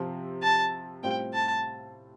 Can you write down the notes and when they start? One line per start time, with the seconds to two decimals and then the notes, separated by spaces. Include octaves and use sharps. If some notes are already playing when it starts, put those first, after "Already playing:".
Already playing: C3 F3 C4
0.43 A5
1.03 A2 G3 C4 F4 C5 G5
1.34 A5